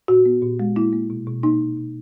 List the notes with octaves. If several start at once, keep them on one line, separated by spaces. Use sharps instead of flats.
A#2 F#4
B3
A#2
G#3
A#3 E4
A#3
B2
B2
A#3 D#4
B2
B2